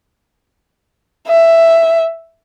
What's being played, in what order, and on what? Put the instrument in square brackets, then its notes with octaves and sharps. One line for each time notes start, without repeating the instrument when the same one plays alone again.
[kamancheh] E5